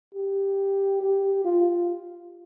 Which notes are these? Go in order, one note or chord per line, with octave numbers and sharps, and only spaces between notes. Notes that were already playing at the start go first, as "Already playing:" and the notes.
G4
G4
F4